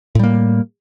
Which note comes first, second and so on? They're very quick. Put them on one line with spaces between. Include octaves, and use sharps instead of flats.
A2 G3 A#3